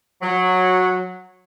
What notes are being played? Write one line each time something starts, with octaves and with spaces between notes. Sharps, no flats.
F#3